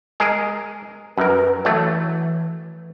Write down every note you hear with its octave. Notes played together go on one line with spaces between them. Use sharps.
G#3 G#4 A#4
F#2 A#4 B4
E3 F#3 A3